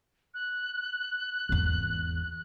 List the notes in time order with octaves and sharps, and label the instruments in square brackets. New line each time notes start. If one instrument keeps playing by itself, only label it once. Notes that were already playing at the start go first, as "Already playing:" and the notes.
[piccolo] F#6
[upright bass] G#1 E2